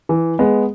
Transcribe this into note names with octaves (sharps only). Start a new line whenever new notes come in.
E3
G#3 B3